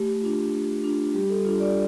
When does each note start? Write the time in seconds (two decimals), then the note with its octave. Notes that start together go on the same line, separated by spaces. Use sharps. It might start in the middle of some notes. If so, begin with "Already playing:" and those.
Already playing: A3 G4
0.22 D4 F4
0.52 A3
0.84 D4 F4
1.14 G3 G4
1.30 A4
1.45 D4 F4
1.60 D5